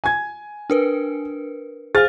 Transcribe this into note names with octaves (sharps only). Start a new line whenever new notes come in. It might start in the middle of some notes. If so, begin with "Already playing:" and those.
G#5 G#6
D4 A#4 B4
G#4 C5 F5 F6 A6